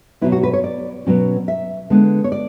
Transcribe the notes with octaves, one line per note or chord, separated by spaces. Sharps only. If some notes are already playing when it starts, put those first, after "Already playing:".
B2 F#3 B3 E4
F#4
B4
C#5
D5
B2 F#3 C#4
E5
D3 G#3 B3 D4
C#5
D5